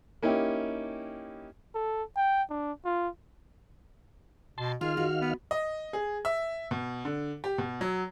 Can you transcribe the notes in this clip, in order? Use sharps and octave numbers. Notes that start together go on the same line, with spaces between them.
A#3 C#4 D#4 E4 G4
A4
G5
D4
F4
B2 A5 C6
D#3 F4 G#4 F5 F6
F#4
B3
D#5
G#4
E5
B2
D3
G4
B2
F#3